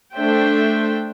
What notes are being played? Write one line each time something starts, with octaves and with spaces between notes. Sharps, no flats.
A3 D4 C5 E5 G5